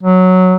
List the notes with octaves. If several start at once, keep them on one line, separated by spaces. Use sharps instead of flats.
F#3